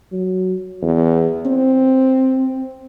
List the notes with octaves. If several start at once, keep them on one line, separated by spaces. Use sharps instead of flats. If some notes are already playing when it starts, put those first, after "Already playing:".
F#3
E2
C4